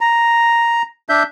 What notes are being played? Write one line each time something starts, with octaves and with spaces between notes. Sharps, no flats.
A#5
D4 E5 G6